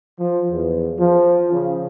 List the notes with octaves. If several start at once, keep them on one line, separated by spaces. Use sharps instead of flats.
F3
E2
F3
C#3